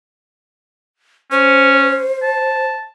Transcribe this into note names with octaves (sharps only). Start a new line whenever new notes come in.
C#4 C5
A5